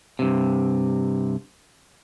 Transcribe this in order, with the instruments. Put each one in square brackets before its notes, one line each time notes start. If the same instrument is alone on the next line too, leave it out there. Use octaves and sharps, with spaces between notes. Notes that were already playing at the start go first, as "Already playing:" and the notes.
[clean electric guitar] G2 C3